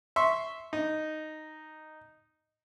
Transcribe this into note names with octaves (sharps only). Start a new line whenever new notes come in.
E5 C6 C#6
D#4